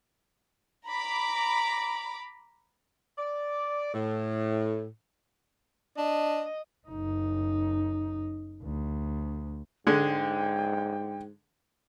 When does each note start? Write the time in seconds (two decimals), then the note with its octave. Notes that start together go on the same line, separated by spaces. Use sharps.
0.88 A#5 B5 D6
3.18 D5
3.94 A2
5.98 D4 D#5
6.88 F#1 D#4
8.63 D2
9.87 G#2 D3 G#3 G5